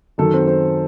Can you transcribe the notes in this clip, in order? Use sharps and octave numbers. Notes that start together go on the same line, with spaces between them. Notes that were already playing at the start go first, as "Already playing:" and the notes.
F#2 D#3 F#3 A4
C4
C4